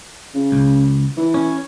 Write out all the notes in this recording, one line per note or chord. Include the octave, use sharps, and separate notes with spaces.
C#3
C#2
E3
C#4